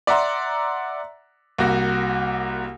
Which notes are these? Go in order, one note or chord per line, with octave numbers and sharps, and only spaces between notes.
D5 E5 F#5 A#5 C6
C2 A#3 F#4